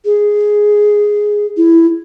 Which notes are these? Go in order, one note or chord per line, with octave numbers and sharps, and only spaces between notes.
G#4
E4